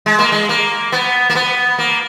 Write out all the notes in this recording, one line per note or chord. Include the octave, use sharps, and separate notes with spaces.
G#3
A#3
G#3
A#3
B3
A#3
B3
A#3